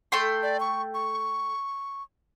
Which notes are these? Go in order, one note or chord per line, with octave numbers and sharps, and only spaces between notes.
A3 G5 C6
D5
C#6
C#6